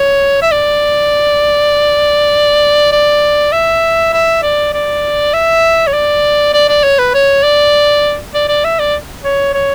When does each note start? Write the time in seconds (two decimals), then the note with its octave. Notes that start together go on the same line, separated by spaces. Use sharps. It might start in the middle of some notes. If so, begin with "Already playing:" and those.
Already playing: C#5
0.42 E5
0.52 D5
2.92 D5
3.52 E5
4.13 E5
4.42 D5
4.74 D5
5.34 E5
5.87 C#5
5.94 D5
6.54 D5
6.69 D5
6.83 C#5
6.99 B4
7.14 C#5
7.44 D5
8.34 D5
8.49 D5
8.65 E5
8.79 D5
9.24 C#5
9.54 C#5